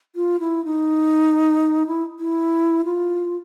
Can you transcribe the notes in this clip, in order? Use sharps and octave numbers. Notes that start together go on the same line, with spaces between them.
F4
E4
D#4
E4
E4
F4